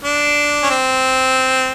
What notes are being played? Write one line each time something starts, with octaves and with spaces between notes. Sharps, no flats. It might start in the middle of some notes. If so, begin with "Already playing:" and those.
D4
C#4
C4